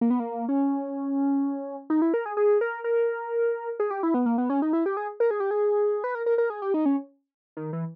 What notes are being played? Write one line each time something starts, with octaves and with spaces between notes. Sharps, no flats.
A#3
B3
A#3
C#4
D#4
E4
A#4
G#4
G#4
A#4
A#4
G#4
G4
E4
B3
A#3
B3
C#4
D#4
E4
G4
G#4
A#4
G#4
G4
G#4
B4
A#4
A#4
A#4
G#4
G4
D#4
C#4
D#3
E3